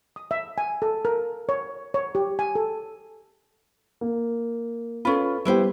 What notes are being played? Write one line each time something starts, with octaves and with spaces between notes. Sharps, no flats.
D#6
E5
G#5
A4
A#4
C#5
C#5
G4
G#5
A4
A#3
C#4 F4 A4 B4 B5
G3 B3 E4 G4 B4 C5